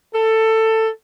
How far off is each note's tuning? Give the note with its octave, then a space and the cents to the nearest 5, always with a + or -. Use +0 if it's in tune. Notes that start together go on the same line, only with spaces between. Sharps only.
A4 +15